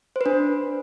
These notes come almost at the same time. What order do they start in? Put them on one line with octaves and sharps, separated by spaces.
C5 B4 D4